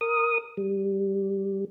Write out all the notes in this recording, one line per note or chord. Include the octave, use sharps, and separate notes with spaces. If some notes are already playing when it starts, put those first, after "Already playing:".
A#4 D#6
G3